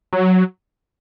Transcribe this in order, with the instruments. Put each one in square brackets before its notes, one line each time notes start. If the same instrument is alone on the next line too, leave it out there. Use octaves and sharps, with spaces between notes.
[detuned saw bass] F#3